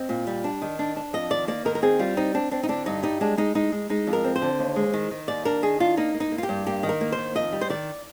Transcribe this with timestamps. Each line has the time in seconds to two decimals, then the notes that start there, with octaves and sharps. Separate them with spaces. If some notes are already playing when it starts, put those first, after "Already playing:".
Already playing: C4 D#5
0.09 A#2
0.27 G3
0.44 D4
0.62 D#3
0.79 D4
0.96 D4
1.13 F2 D#5
1.31 D#3 D5
1.48 A#3 D5
1.65 D#3 A#4
1.75 A#4
1.82 C4 G#4
1.99 G3 F4
2.17 C4 D#4
2.34 C4 D4
2.51 C4 D4
2.63 D#4
2.69 D3 D4
2.86 G2 D#4
3.03 G3 D#4
3.21 G#3 D4
3.37 G#3 D#4
3.55 G#3 D#4
3.72 G#3
3.90 G#3 D#4
4.07 F2
4.13 A#4
4.24 C4
4.36 C5
4.42 D3
4.59 D#2
4.76 G#3
4.94 D#3
5.11 D#3
5.28 D#2 D5
5.45 D4 A#4
5.62 D#3 G#4
5.80 D4 F4
5.97 A#3 D#4
6.14 A#3
6.20 D#4
6.32 A#3
6.38 F4
6.43 G4
6.49 G2
6.67 A#3 G4
6.83 D#3
6.89 A#4
7.01 A#3
7.12 C5
7.18 D#3
7.35 F2 D#5
7.52 G3
7.61 C5
7.70 D#3 D5